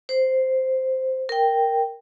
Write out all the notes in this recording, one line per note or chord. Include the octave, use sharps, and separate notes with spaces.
C5
A#4 G5